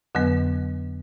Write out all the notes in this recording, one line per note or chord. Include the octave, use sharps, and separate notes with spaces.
F2 D3 F#3 B3